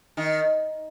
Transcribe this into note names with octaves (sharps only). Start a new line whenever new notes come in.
D#3